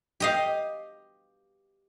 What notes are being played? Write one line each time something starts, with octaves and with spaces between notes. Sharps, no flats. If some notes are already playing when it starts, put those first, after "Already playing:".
G4 D#5 F5